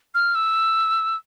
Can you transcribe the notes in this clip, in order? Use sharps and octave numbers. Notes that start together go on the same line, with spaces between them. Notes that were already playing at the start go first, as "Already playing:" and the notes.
F6
E6